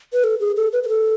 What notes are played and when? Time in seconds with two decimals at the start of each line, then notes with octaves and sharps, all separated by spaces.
0.13 B4
0.24 A4
0.40 G#4
0.56 A4
0.72 B4
0.83 B4
0.88 A4